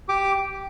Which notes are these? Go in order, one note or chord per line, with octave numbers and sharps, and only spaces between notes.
G4 D6